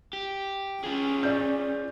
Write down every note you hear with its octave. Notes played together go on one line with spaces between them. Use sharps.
G4
C#4 F4 G#4
D5 G6